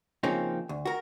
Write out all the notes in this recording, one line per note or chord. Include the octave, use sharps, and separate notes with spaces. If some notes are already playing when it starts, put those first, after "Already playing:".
C#3 F3 A#3 C4 C#4 D#4
D2
F#4 A#4